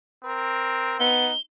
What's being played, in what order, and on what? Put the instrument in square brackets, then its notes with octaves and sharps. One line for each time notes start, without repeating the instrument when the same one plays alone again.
[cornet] C4 [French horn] A#4
[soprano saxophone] B3 [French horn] D#4 [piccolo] G7